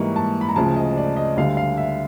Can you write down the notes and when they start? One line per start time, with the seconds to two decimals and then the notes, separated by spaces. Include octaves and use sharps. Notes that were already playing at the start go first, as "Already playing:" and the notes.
Already playing: G#2 E3 G3 A#3 C#6
0.16 A5
0.41 B5
0.49 A#5
0.56 D2 C#3 F3 A5
0.76 D#5
0.97 D5
1.16 D#5
1.37 D2 D3 G3 F5
1.57 F5
1.77 E5